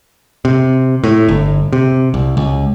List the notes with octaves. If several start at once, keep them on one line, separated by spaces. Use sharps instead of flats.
C3
A2
G1
C3
C2
C#2